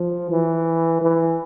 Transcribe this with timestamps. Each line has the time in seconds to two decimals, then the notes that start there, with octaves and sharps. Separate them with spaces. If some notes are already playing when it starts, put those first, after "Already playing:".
Already playing: F3
0.30 E3
1.01 E3